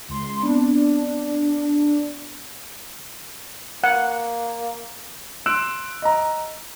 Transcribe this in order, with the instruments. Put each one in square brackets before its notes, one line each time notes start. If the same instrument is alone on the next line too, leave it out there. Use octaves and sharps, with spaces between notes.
[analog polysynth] C#2 C6
[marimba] B3 C4 [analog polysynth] D4
[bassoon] A#3 [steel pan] F#5
[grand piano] C6 E6 F#6 D7 E7
D#5 A#5